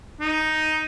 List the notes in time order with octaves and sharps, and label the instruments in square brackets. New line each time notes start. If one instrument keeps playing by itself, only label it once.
[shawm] D#4